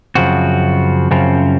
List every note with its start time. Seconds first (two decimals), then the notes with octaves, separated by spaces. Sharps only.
0.15 F#2 C#3 F3 C4 F#4
1.11 F#2 C#3 F3 C4